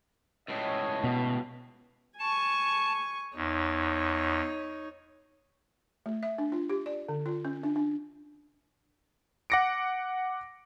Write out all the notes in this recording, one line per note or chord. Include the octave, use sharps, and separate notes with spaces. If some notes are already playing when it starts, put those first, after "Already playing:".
C#2 A2 C#5 D#5
B2
G#5 A5 C#6
E2 D#4 C#5
A3
E5
D4
F4
G4
D5
D3
F4
C#4
D4
D4
F#5 D6 A#6 C#7 D7